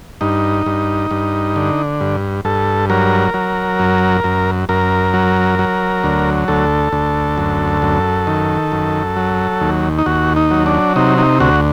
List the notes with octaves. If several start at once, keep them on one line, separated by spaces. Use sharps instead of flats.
G2 D#4
G2
G2
D3
G2
G2 A4
F#3 A#4
F#3
F#2
F#2
F#2 A#4
F#3
F#3
D2
D2 A4
D2
F#2
F#2
D#3
F#2
F#3
D#2
D#4
D#2 F#4
D#4
F#3
D4
C3 D#4
D#4
D2 F#4